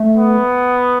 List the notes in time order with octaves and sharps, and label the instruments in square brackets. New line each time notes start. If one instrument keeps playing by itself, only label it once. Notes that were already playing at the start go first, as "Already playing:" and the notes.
Already playing: [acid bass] A3
[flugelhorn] B3